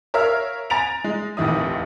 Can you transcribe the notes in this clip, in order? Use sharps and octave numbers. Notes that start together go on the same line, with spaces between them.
A#4 C#5 E5 F5 E6 F6
G#5 A#5 A6 D7 F7
G#3
F1 A#1 D#2 D#3 E4 D#6